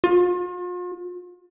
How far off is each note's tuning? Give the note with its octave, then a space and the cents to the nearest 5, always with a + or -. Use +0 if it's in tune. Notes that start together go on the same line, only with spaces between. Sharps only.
F4 +40